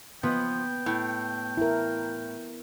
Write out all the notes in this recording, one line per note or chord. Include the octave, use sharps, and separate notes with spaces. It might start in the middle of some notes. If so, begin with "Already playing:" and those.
F3 B3 G5
A2
E4 A#4